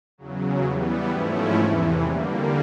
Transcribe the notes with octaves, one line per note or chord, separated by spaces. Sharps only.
E2 C#3 F#3
E3 G3 B3
G#2 F3 A3 C#4 E4
E2 C3 E3
D3 G3 A#3